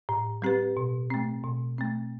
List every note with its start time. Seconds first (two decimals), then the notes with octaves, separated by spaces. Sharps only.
0.09 A2
0.42 G3 C4 G4 B4
0.77 B2
1.10 A3 C4
1.44 B2
1.78 A3 C4